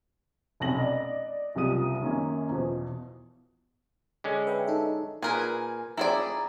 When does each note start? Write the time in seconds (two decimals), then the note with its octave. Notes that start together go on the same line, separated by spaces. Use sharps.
0.60 F1 B1 C#4 A#6 F#7
0.78 D5 D#5
1.55 F#1 C2 G3 F4 D#6 D#7
2.01 F#2 D#3 A#3 C#4
2.49 E2 B2 F3
4.24 D3 G#3 C#4
4.47 B4 E5 G5
4.67 D#4 A4 E5
5.22 A#2 G#4 A#4 B4 G#5
5.97 F2 E4 G#4 D5 A#5